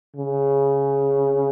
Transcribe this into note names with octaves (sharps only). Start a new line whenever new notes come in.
C#3